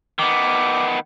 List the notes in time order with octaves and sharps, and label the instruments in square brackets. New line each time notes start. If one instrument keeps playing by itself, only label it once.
[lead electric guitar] D#3 B3 [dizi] D6